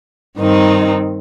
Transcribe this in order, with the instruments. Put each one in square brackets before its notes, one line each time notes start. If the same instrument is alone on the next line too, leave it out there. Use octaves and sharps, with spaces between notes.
[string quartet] G2 D#3 C4 D#4